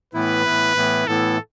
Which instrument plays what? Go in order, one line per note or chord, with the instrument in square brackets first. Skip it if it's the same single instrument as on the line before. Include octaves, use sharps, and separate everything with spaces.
[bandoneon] A2 E3 B3 E4 [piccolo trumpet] B4
[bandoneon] A2 E3 B3 E4
A2 E3 B3 E4
[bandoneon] A2 E3 B3 E4 [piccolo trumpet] A4